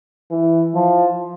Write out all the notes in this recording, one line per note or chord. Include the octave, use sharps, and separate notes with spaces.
E3
F3